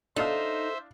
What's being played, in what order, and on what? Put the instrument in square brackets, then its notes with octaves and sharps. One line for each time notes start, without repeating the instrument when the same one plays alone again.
[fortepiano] D4 F5 [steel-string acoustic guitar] D#4 [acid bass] A4 [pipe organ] C5 E5